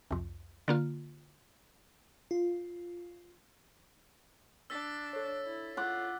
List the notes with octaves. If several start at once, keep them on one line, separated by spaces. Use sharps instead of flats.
C2 F2
D3 A#3 F4
F4
D4 E6 A6 B6
A4 C#5
E4
F4 F#5 D6